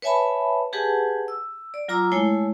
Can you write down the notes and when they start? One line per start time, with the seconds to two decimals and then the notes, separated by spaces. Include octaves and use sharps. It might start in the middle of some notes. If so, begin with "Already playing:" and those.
0.02 B4 C#5 E5 G#5 A5 B5
0.73 G4 G#4 B4 F#5 G#5 A5
1.28 E6
1.74 D5
1.88 F#3 F4 A#5 D6 E6
2.12 G#3 A3 E4 C#5 G#5